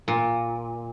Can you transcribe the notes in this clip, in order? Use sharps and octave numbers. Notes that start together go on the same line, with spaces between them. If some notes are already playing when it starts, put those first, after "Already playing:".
A#2